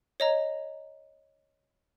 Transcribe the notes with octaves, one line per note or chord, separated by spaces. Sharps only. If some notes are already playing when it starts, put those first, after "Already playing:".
C#5 D#5 A#5